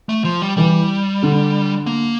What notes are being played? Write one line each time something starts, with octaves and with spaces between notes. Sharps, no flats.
A3
F3
G3
E3 G3
D3
A#3